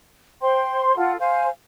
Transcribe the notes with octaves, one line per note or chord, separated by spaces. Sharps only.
C5 G5 C6
F4 A4 F#5
C5 F5 G#5